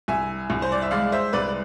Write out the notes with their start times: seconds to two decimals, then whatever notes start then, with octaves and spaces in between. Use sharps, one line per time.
0.08 C2 E5 G#5
0.50 C2
0.62 C5
0.72 D5
0.82 E5
0.91 G#3 D5 F5
1.12 C5 E5
1.33 C2 B4 D5